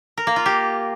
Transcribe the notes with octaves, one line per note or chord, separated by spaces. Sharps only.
A#4
A#3
F4
G4